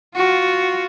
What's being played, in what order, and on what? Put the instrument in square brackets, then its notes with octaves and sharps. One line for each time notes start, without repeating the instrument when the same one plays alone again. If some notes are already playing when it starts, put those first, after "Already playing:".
[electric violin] F4 F#4